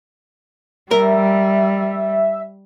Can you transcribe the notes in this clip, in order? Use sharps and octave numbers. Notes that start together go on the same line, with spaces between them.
G3 A#4 E5